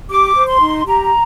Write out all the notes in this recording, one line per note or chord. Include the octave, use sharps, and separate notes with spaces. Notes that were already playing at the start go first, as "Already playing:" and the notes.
G4 D6
C5
C6
D#4
G4 A#5